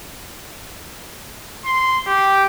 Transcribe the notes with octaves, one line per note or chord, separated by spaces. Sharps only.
C6
G4